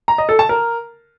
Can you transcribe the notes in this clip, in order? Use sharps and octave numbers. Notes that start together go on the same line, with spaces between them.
A#5
D#5
A4
A5
A#4